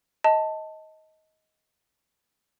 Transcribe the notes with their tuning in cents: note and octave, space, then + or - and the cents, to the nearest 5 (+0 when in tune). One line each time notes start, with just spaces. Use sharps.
D#5 +15 A5 +10